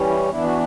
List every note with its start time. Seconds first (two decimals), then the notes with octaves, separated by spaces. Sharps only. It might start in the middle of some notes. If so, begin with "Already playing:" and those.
Already playing: E3 G3 C#4
0.09 E4
0.29 E3 B3 D4 E4
0.43 F#4